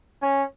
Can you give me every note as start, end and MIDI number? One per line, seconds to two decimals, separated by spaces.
0.22 0.43 61